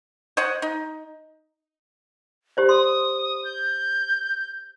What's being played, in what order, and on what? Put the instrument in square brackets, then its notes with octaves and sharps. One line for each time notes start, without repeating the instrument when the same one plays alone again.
[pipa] C5 C#5 D#5 F#5
D#4
[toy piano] G4 C5 D5
[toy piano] C6 [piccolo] D#6
[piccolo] G6